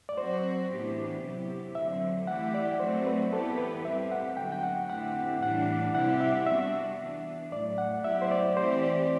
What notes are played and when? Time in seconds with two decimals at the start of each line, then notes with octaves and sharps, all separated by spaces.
0.09 D5
0.18 F#3 C4 F#4 C5
0.70 A2 E3 B3 D4 G4
1.22 C3 F#3 B3 E4 G4
1.75 D3 F#3 C4 E5
2.27 E3 A3 E4 G4 F#5
2.54 D5
2.80 F#3 A3 C4 F#4 C5
3.06 B4
3.32 E3 B3 E4 G4 A4
3.58 B4
3.85 G3 C4 G4 E5
4.12 F#5
4.37 D3 F#3 B3 F#4 G5
4.52 G5
4.63 F#5
4.90 D3 A3 C4 E4 G4 F#5
5.42 A2 E3 G3 D4 F#5
5.95 C3 G3 C4 E4 G4 F#5
6.21 E5
6.47 G3 B3 D4 F#4 E5
6.99 E3 B3 D4
7.52 A2 F#3 A3 D5
7.78 F#5
8.04 F#3 B3 E4 G4 E5
8.22 C5
8.31 D5
8.57 E3 A3 C4 G4 C5
8.83 D5